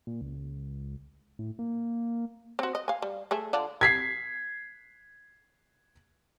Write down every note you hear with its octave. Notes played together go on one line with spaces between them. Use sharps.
A#2
C#2
A2
A#3
C4 F#4
D#5
F5 G#5
G3
A3 G#4 E5
D3 F4 D5
G#6 B6 C7